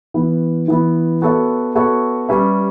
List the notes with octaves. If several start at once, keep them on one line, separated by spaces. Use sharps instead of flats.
E3 B3 E4
E3 B3 E4
B3 F#4 A4 C#5 E5
B3 F#4 A4 C#5 E5
G3 C#4 G4 B4 E5